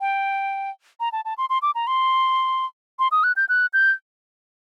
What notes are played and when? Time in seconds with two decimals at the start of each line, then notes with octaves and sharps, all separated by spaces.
0.01 G5
1.00 A#5
1.12 A5
1.25 A5
1.38 C6
1.50 C6
1.62 D6
1.75 A#5
1.87 C6
2.99 C6
3.12 D#6
3.24 F#6
3.36 G6
3.49 F#6
3.73 G6